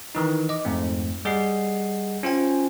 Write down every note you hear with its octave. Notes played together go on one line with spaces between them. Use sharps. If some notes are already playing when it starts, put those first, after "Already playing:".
D#3 E3 D#4
D#5 D6
F2 G#2 A3 C4
G3 G#4 D#5 F#5 C7
C#4 F4 C5 G5 G#5